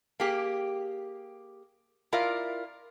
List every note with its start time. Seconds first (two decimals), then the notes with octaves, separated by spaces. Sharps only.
0.20 A#3 G4 G#4
2.12 E4 F4 A#4 D5 E5 F5